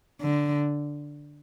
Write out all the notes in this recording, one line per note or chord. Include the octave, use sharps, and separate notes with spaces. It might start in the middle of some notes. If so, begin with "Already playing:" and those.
D3